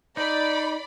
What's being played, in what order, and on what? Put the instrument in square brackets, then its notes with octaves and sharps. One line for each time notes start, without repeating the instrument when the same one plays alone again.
[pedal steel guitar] D#4 [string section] D5 B5